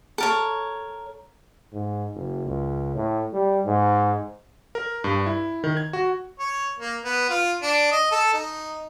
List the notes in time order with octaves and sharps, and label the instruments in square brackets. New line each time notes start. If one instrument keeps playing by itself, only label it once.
[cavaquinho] A4 A#4 C#5
[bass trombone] G#2
F#1
C#2
A2
G3
G#2
[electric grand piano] A#4
G2
E4
D#3
G#6
F#4
[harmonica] C#5
A#3
B3
F4
D4
D#5
A4
D#4